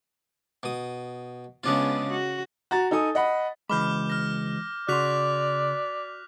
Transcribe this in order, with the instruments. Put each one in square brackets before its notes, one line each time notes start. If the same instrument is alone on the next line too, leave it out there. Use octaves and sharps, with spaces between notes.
[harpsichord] B2 D#6
[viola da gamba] C#3 B3 [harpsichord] G#3 D4 F4
[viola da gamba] F#4
[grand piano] F#4 A#5 A6
D#4 A4 G#5 D#6
D#5 F#5 B5
[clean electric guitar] C#2 B5 [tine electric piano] E3 G#3 [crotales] D6 F6 G6
[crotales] F6 A#6
[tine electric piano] C#3 C6 [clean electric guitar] F#4 [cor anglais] D5 [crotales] F#6 B6 F7